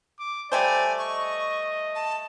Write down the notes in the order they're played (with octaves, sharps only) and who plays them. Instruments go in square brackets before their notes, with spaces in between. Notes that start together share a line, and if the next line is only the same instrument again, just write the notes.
[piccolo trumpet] D6
[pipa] G3 A3 C5 [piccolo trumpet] D5 [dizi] G#5
[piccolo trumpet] D#5 [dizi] C#6
[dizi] A5